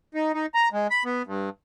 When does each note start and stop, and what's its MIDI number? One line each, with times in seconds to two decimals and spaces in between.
0.14 0.32 63
0.34 0.46 63
0.54 0.69 82
0.73 0.87 56
0.91 1.03 83
1.05 1.22 59
1.26 1.49 43